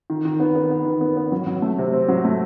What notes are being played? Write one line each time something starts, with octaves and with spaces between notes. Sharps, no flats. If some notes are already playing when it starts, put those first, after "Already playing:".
D#3
D#3
B3
B3
B3
D#3
B3
B3
F#3
F#3
A3
C3
C4
F#3
A3